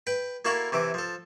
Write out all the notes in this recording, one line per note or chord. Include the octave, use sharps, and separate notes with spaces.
B4 G5 B5
A#3 E4 F#4 A4 F5 B5
C3 E3 E4 D6
F3 A4